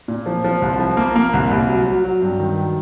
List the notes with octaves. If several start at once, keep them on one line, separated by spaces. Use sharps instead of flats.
A#2
F3
F3
C2
F3
A#3
A#3
C2
C2
F#3
F#3
F#3
G2
D#3
F#3